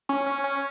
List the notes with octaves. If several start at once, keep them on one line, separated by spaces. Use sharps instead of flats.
C#4
C#4
C#4